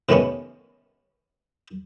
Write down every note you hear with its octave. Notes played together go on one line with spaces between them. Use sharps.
C3 D#3 A3 B3 C#4